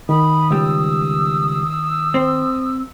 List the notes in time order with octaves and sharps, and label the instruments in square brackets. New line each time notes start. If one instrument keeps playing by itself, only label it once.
[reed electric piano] D#3 [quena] B5 [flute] D#6
[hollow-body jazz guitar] C#2 G3 [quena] E6
[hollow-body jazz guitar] C4 C5